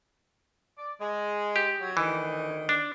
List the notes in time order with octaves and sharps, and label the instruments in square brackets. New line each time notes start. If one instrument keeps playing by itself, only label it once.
[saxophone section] D5
G#3
[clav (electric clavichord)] G4
[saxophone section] F#3
[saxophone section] D2 D#3 [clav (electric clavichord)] E3
[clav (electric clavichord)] D4